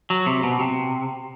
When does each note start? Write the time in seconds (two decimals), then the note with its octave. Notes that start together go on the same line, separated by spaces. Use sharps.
0.10 F#3
0.26 C3
0.43 B2
0.60 C3